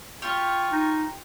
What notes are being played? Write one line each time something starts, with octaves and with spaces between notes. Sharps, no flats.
F4 G4 C#6
D#4